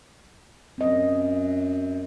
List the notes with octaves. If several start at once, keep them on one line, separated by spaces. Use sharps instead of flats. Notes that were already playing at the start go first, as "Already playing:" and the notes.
F#2 C4 D#5